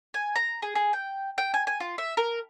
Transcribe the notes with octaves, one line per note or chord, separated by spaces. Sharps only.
G#5
A#5
G#4
G#4
G5
G5
G#5
G#5
F4
E5
A#4